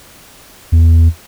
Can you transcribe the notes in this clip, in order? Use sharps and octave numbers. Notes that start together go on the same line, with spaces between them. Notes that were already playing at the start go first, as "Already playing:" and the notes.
E2